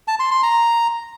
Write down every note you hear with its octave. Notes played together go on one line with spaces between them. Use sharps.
A5
C6
C6
A#5